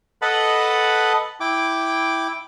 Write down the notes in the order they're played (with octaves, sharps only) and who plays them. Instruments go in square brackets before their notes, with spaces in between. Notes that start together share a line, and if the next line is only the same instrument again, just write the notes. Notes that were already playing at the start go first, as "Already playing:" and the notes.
[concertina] A4 B4 D#5 F#5 A5 B5
E4 G5 D6